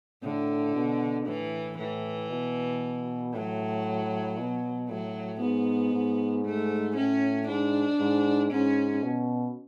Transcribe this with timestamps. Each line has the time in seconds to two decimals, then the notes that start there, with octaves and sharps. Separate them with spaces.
0.23 A2 D3
0.75 B2
1.26 A2 E3
1.78 A2 E3
2.30 B2
3.34 A2 F#3
4.38 B2
4.89 A2 F#3
5.41 G#2 B3
5.94 G#2
6.45 A3
6.97 A2 C#4
7.48 G#2 D4
8.00 G#2
8.52 G#2 C#4
9.03 B2